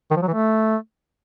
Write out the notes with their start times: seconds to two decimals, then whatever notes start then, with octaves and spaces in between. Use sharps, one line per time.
0.10 D#3
0.16 F3
0.22 F#3
0.28 E3
0.33 A3